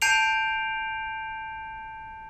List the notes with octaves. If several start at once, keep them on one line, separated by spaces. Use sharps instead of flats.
A5 G6 C7 D7 F7